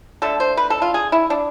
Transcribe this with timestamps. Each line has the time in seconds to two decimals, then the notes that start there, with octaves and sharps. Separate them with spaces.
0.22 D3 A3 A4
0.40 C5
0.57 B4
0.70 A4
0.82 F4
0.94 G#4
1.12 E4
1.30 D4